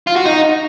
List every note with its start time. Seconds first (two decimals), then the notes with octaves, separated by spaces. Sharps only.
0.07 F4
0.16 F#4
0.25 D#4